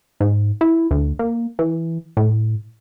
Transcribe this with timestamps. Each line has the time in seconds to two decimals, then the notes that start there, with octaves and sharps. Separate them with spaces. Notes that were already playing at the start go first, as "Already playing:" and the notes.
0.20 G#2
0.61 E4
0.91 D2
1.19 A#3
1.59 E3
2.17 A2